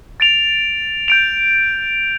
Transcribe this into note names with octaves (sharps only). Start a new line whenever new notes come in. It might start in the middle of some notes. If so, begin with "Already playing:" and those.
A6 D7 F7
G6 D7 F7